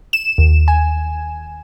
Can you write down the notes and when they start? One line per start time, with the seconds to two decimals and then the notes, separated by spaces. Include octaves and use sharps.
0.13 E7
0.38 D#2
0.68 G#5